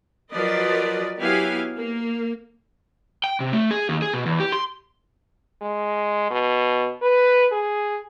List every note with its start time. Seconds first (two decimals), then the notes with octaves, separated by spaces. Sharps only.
0.33 F3 F#3 A#4 B4 D5 D#5
1.20 F#3 B3 E4 G4 F5 G#5
1.77 A#3
3.24 G5
3.40 C3
3.53 A3
3.71 G#4
3.89 D#2
4.02 G#4
4.14 B2
4.26 E2
4.40 G4
4.52 C6
5.62 G#3
6.30 B2
7.02 B4
7.52 G#4